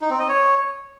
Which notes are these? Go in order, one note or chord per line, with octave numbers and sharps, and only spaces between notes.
D#4
C4
D#5
C#5